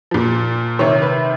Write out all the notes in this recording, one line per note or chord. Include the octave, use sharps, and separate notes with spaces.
A#2 F3
C3 D#3 C#5
B4